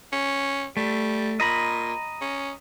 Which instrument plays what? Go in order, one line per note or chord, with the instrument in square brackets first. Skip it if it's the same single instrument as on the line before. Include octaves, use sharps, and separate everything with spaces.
[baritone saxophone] C#4
[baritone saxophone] G3 [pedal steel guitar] A3
[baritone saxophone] A#2 [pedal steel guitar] D#5 A#5 B5
[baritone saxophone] C#4